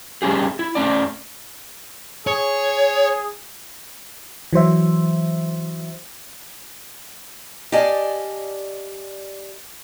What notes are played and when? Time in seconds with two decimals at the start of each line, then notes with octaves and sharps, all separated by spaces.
0.22 G3 A3 C#4 G4 G#4
0.59 E4
0.75 A3 C#4 D5
2.27 G#4 C#5
4.53 E3 F#3 C5 E5
7.72 G4 D5 D#5 F5 G#5 A5